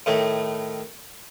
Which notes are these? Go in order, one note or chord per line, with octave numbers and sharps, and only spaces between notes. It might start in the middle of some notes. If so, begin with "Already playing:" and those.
A2 D#3 A3